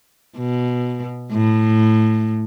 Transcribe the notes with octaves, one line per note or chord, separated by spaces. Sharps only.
B2
A2